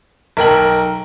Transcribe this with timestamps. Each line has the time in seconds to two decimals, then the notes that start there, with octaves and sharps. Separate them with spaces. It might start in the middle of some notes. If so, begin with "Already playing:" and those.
0.37 B1 A#4 G5 F#7